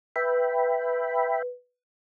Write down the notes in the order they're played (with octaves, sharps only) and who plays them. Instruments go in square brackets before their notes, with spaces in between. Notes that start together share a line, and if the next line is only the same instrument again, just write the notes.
[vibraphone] B4 [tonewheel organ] E5 G5 B5